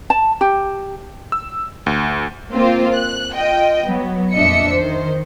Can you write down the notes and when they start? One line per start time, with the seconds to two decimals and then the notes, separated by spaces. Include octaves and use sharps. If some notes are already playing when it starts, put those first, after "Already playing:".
0.10 A5
0.41 G4
1.32 E6
1.86 D2
2.53 A#3 C4 F4 C5
2.94 F#6
3.34 F4 D#5 G5
3.85 F#3 B3
4.34 F2 A#2 D4 D#5 E5 C#7
4.73 D#3 C5